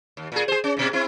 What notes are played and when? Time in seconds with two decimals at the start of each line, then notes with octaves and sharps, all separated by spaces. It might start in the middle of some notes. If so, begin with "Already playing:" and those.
0.17 D#2
0.32 A#2 G#4
0.48 G#4 C5
0.64 C#4
0.77 G#2 B2
0.93 C4 E4